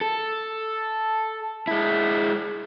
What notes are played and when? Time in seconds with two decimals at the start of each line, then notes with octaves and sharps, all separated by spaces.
0.01 A4
1.67 G#3 E4